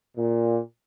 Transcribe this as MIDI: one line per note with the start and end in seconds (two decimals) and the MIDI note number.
0.17 0.59 46